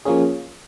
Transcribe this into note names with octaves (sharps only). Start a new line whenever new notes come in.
F3 A#3 C#4 G#4